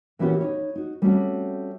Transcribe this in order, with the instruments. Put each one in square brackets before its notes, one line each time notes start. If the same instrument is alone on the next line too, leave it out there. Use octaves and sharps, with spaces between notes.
[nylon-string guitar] A#2 E3 B3 C#4 F#4 G4
D#4 C#5
D#4 F#4
G3 A3 C4 C#4 F#4